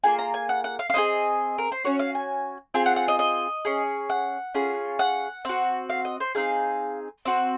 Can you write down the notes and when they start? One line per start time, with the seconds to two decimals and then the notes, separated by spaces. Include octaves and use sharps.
0.04 A#3 F4 G#4 G#5
0.19 A#5
0.34 G#5
0.49 F#5
0.64 F#5
0.79 F5
0.90 F5
0.94 C4 F4 G#4 D#5
1.58 A#4
1.72 C5
1.84 C#4 F#4 C#5
1.99 F5
2.15 G#5
2.74 C4 F4 G#4 G#5
2.86 F#5
2.96 F#5
3.08 D#5
3.19 D#5
3.65 C#4 G#4
4.10 F#5
4.54 C#4 F4 G#4
4.99 F#5
5.45 C4 F#4
5.90 F5
6.05 D#5
6.20 C5
6.35 C4 D#4 G#4 F5
7.25 C4 F#4